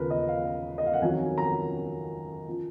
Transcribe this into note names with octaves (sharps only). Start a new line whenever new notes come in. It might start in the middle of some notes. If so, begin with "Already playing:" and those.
Already playing: D#2 C#3 F3 A#4 B4
D#5
F5
D#5
F5
F#5
F2 D#3 F#3 G#5
A#5
F3